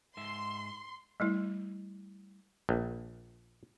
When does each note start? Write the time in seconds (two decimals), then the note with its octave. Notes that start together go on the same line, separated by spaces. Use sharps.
0.17 G#2 E5 C6
1.20 G3 A3 E4
2.69 A#1